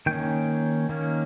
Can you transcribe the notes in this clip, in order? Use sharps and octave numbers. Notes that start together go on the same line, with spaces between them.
D#3 A#3 C#4 G5
D#3 A#3 C#4